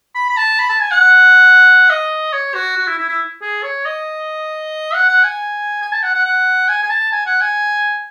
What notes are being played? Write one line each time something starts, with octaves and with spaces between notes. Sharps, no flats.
B5
B5
A5
B5
A5
G#5
F#5
D#5
C#5
F#4
F#4
E4
E4
E4
G#4
C#5
D#5
F#5
F#5
G#5
G#5
A5
F#5
F#5
F#5
G#5
G#5
A5
G#5
F#5
G#5